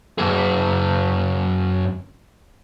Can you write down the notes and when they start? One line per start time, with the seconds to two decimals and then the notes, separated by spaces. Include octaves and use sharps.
0.18 F#2 G#4